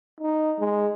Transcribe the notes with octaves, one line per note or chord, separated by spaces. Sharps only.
D#4
G#3